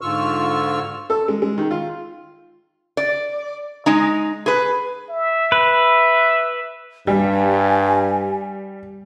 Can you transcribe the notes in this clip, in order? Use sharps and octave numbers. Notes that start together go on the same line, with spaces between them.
G#2 D3 F4 C#6 E6 F6
A4
G#3
G#3
D#3
F4
D5
G#3 D#4
G#4 B4
E5
B4
G2 G3 G#5